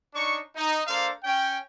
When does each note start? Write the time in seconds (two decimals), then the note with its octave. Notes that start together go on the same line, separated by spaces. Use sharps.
0.14 D4 D#4 C#5 C#6
0.54 D#4
0.87 A#3 D4 A4 C5 F5
1.24 C#4 G5